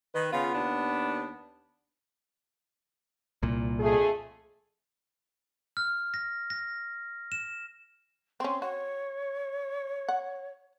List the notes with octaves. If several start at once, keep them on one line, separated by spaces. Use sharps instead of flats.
D#3 B4
C#3 B3 F4
D#2 D4
C2 A#2
F2 A3 G#4
F6
A#6
A#6
E7
C4 C#4 C6
F#4 C#5
F#5